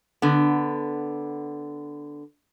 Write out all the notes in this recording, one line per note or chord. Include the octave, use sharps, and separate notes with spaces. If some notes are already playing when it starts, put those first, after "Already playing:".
D3 B3